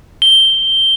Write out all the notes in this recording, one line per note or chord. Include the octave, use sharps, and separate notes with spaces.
G7